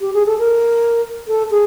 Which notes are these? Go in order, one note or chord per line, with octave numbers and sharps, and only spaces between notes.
G4
G#4
A4
A#4
A4
G#4